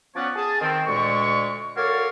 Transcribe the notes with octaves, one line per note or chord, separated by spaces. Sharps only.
F3 B3 C#4 C#5 D5 F#5
G#4 A5
D#3 C4
D2 A#2 G#3 C#6
F#4 A4 A#4 C#5 D5 F5